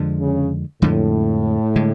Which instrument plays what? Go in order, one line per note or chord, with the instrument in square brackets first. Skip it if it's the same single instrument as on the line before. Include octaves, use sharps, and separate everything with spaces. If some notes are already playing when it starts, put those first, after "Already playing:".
Already playing: [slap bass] F2 D3 F3 G#3
[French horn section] C#3
[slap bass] F2 D3 F3 G#3 [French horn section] A2
[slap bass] D3 G#3